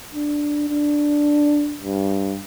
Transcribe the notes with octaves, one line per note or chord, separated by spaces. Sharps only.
D4
D4
G2